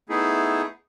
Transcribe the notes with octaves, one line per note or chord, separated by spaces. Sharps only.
A3 B3 D#4 E4 G#4